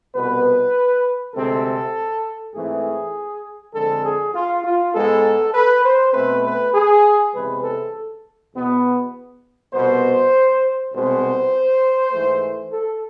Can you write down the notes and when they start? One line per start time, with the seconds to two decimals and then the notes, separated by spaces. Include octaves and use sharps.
0.14 C2 B2 B3 B4
1.34 D2 C3 G#3 C4 A4
2.54 G#2 E3 A3 C4 G#4
3.74 F2 D3 G#3 C4 A4
4.04 G#4
4.34 F4
4.64 F4
4.94 G#2 G#3 B3 A4
5.54 B4
5.84 C5
6.13 B2 A3 C4 B4
6.44 B4
6.74 G#4
7.33 E2 C3 G#3 B4
7.63 A4
8.53 E2 B2 B3
9.73 C2 B2 B3 C5
10.93 C2 B2 G#3 C4 C5
12.12 G#2 E3 A3
12.72 A4